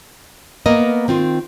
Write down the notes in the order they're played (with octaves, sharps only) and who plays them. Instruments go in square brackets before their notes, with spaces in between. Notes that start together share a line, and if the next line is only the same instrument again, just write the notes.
[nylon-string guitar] A#3 B3 A#4 D#5
D#3 C4 F4